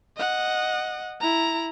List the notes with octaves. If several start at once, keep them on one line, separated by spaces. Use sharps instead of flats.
D#5 F#5
E4 A#5